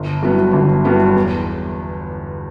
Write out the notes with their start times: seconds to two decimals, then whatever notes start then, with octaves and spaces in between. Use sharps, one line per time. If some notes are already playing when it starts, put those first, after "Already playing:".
Already playing: G1
0.22 G2 F#3 B3 E4
0.53 G1
0.85 G2 F#3 B3 E4
1.16 E2